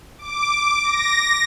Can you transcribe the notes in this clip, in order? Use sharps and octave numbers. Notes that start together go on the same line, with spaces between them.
D6
A#6